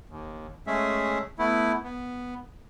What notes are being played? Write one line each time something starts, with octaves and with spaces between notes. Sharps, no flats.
D#2
G#3 A3 C#4 G#4 E5
A3 B3 E4
B3